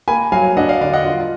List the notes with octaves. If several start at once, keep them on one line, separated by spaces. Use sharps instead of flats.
A#3 G#5 B5
F#3 F5 G#5
D4 D#5 F#5
D5 F5
D3 D5 F5
D#5 F#5
F4